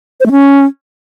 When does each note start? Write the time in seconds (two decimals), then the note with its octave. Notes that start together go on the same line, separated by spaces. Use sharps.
0.20 C5
0.26 A3
0.31 C#4